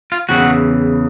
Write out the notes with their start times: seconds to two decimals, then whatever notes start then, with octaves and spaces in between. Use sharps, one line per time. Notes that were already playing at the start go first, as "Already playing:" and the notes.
0.12 F4
0.29 E2 C#3 E3 F#4